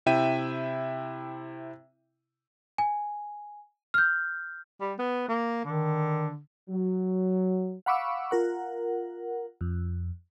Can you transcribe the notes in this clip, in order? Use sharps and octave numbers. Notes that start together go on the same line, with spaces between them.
C3 E4 E5 G5 D#7
G#5
F6 G6
G3
B3
A#3
D3 D#3
F#3
F5 F#5 B5 C#6 D6 E6
F4 A#4 F#5
F2